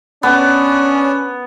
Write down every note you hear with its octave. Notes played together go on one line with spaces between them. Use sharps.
B3 C#4 D4